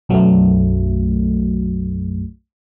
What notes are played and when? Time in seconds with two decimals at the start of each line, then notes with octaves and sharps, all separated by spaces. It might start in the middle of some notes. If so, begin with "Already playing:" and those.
0.09 B1 F#2 F#3 A3